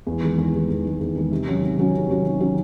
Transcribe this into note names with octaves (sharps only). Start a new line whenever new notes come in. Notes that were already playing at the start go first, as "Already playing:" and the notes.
E2
D#3 G#3
E2
D#3 G#3
E2
D#3 G#3
E2
D#3 G#3
C3
D#3 F#3 C#4 F#4
C3
D#3 F#3 C#4 F#4
C3
D#3 F#3 C#4 F#4
C3
D#3 F#3 C#4 F#4